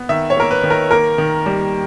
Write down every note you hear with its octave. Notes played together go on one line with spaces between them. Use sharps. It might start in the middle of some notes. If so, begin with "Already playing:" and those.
Already playing: B3
D#3 E5
C#5
A#3 A#4
B4
D#3
A#4
A#3 A#4
D#3
G3